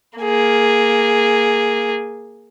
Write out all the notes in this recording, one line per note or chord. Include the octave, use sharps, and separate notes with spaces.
A#3 G#4